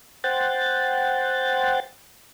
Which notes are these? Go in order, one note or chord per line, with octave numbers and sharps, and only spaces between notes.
C5 F#5 G5 A6